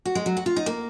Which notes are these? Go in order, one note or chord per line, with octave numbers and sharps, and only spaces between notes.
F#4
G#3
F#3
F#4
F4
D#4
A#3